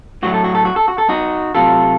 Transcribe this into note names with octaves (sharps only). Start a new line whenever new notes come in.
A2 F#3 A3 F#4
A4
F#4
A4
F#4
A4
F#4
A4
D#4 F#4
C3 F#3 A3 F4 A4